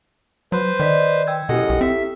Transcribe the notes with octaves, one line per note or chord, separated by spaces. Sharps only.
F#3 B4 C5
D#3 D5 D#5 B6
G5 E6 G#6
F#2 B2 E4 G4 A4 D#5 F#5
B1
C4 E5